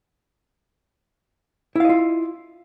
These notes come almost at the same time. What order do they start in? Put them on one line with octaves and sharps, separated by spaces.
E4 F5 D#5 F4